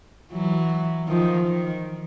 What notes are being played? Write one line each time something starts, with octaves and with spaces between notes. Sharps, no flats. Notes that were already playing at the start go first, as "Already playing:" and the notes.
E3 F#3
D#3 F3
D#3